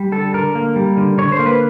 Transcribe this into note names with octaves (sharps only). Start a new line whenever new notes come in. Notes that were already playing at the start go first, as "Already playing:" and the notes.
Already playing: G3
D3 A4
D3 A#4
A#3
G3
D3
D3 C#5
C5
A#3
B4